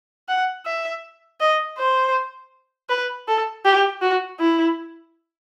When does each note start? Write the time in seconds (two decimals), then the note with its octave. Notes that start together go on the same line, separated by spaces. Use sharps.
0.29 F#5
0.66 E5
1.41 D#5
1.77 C5
2.90 B4
3.28 A4
3.65 G4
4.01 F#4
4.40 E4